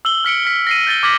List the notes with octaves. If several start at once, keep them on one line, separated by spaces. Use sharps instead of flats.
E6 F#7 G7
F6 B6 C#7 D7
F6 B6
A#6 C7 D#7
G6 A6 G7
D6 F6 G#6 A#6 B6 F#7